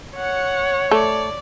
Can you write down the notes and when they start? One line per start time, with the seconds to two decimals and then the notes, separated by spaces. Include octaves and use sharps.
0.17 C#5 F#5
0.91 A3 D5